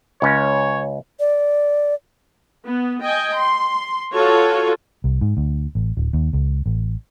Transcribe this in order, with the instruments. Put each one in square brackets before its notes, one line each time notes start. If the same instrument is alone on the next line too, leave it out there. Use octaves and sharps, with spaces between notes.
[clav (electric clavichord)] C#2 C#4 [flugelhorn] C#5
[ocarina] D5
[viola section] B3
D#5 G5 G#5
C6
F4 F#4 A4 C#5
[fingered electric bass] C2
G#2
D2
A1
D1
D#2
C#2
A1